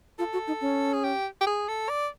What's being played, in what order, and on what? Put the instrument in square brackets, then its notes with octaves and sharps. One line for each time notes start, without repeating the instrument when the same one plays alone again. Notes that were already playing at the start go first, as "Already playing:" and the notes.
[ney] F4 [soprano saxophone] A4
[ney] F#4
D#4
C#4
[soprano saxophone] G#4
G4
G4
G#4
A4
D5